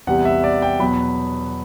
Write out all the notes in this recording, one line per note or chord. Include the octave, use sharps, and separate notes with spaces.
E2 C3 E3 G3 F#5
E5
D5
G5
E2 B2 F#3 B5